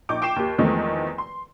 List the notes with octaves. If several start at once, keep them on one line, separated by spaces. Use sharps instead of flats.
A#1 D#4 C#6 D6 G6
G5 D6 C7 E7
D#2 G4
E2 D#3 F3 G#3 A3 C4
C6